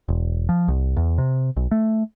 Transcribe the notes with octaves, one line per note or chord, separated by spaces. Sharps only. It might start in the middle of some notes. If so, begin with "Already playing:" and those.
E1
F3
C2
E2
C3
B1
A3